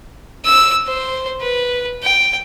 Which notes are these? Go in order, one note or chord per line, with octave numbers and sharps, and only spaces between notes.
E6
C5
B4
G5